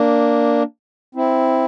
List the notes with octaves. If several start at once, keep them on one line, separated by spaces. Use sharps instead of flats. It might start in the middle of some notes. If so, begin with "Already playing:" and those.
Already playing: A#3 D4
C4 E4